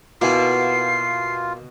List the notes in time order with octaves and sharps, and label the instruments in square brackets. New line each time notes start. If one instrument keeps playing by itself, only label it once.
[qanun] B2 [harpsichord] A#3 E4 G#5 [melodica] F4 [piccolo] C7